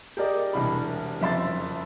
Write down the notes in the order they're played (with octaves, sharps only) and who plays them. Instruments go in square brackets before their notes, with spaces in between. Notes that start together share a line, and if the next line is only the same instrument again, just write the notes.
[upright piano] G4 G#4 A#4 D5 D#5
E1 C2 B5
F#1 F2 E5 C6 A6